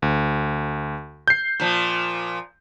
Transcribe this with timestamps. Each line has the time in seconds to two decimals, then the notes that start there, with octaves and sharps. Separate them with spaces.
0.02 D2
1.28 G6 C7
1.60 A#2 F3